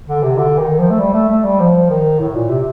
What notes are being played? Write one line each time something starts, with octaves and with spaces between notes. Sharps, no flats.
D3
C3
D3
D#3
F3
A3
G3
A3
A3
G3
F3
D#3
A2
A#2
C3